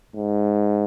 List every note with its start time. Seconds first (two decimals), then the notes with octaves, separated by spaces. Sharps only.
0.15 G#2